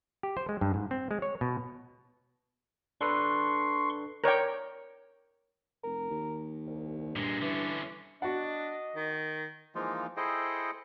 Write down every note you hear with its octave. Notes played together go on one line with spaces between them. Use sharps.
G4
C5
G#3
G2
G#2
C4
G#3
C#5
B2
D4 A4 B4 C6 C#6
A#4 C#5 D5 G5
F1 A#4
D#2
C2
G2 A#2 G#3
D3 E3 C#4
D4 F#4 D#5 F#5
D#3
E3 F3 G#3 A#3 D#4 F4
E4 G#4 A4 C5 D#5 G5